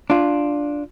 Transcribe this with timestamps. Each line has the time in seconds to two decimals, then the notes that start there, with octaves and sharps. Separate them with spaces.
0.10 D4 F4